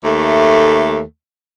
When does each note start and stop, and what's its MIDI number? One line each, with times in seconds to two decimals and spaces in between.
0.04 1.01 39
0.04 1.01 57